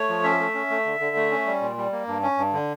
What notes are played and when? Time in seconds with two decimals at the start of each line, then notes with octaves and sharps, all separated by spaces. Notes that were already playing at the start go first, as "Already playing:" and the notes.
Already playing: A3 C#5
0.09 F3
0.24 C#4 E5
0.39 A3
0.54 C#4
0.70 A3
0.85 D3
1.00 D3
1.16 A3
1.31 C#4
1.46 G3
1.61 A#2
1.77 G3
1.92 A#3
2.08 G2
2.23 C#4
2.37 G2
2.53 D3